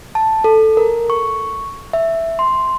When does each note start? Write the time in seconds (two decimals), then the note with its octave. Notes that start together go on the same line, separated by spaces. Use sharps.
0.15 A5
0.44 A4
0.77 A#4
1.10 C#6
1.93 E5
2.39 C6